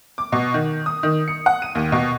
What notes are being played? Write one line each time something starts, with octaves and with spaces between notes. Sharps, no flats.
D6
B2
D#3
D#6
D#3
C#7
F#5
D#7
D#2
B2